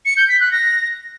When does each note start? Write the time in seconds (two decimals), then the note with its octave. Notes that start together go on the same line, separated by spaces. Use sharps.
0.05 C#7
0.17 G6
0.29 B6
0.40 F#6
0.52 A#6